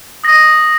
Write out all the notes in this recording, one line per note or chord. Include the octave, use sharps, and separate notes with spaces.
D#6 A#6